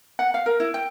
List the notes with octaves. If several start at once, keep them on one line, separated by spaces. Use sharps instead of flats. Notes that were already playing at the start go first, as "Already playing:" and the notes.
F#5
F5
A#4
E4
G5